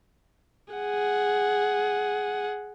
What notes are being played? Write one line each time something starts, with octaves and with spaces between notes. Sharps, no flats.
G#4 F#5